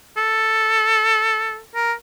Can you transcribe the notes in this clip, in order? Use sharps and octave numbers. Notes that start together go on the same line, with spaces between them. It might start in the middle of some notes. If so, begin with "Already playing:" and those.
A4
A#4